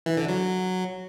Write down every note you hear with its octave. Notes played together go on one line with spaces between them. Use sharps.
E3
D3
F#3